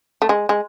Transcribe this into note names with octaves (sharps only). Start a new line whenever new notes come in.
A3
G#3
G#3